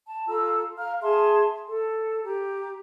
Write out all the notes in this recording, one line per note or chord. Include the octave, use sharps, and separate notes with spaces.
A5
F4 A4 A#5 E6
F5 A#5 F6
G#4 E5 A5 C6
A4
G4 A#5